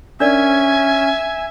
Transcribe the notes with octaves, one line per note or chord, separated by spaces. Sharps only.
C#4 D4 A#4 D5 E5 G#5